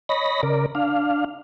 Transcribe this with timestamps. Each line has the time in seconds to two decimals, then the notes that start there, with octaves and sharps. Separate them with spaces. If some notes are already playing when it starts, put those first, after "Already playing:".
0.09 C#5 D#5 B5 A#6
0.43 C#3 A#4 D5
0.75 D4 F5